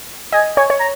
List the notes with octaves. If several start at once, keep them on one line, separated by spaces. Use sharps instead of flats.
D#5 G#5
C#5 G#5
C#5
A#5